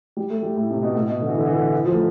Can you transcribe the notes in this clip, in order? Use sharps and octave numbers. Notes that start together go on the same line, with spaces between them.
G3
A3
G3
A2
C3
B2
A2
B2
D3
E3
D3
E3
D3
E3
F3
A3